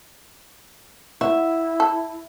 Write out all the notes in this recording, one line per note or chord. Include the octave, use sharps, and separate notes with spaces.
E4 F#4 E5
A4